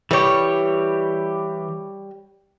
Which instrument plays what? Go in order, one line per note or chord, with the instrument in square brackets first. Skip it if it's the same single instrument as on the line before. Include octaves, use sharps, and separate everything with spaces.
[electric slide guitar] E3 G4 [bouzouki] G3 C#5